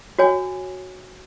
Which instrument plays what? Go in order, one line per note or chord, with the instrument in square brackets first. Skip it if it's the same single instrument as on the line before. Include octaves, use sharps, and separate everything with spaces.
[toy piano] F#4 C#5 G#5